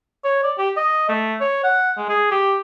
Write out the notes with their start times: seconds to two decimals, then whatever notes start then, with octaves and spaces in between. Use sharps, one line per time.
0.24 C#5
0.43 D5
0.58 G4
0.77 D#5
1.09 A3
1.40 C#5
1.64 F#5
1.97 G#3
2.09 G#4
2.31 G4